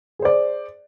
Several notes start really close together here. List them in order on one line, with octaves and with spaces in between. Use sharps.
G#4 C5 D5